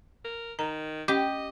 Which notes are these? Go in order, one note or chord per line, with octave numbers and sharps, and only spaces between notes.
A#4
D#3 A#5
C#4 G4 D#5